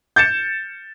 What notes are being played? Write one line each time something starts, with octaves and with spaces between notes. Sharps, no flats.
G6 A6 C#7 E7